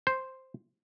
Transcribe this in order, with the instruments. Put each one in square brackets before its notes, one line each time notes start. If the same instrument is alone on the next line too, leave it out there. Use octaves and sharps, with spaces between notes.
[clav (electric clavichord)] C5